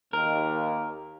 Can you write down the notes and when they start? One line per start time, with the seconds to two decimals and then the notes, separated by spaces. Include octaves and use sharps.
0.13 D#2 A#4